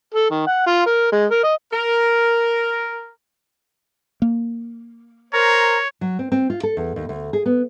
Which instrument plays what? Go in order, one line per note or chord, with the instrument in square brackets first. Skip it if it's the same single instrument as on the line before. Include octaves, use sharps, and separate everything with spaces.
[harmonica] A4
D#3
F#5
F4
A#4
G#3
A#4
D#5
[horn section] A#4
[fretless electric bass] A#3
[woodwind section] A#4 C5 A#5 [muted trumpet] C#5
[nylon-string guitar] F#3
C4
C4
F4
A4
E2
D#2
D2
G#4
B3